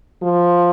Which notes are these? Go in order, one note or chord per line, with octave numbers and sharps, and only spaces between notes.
F3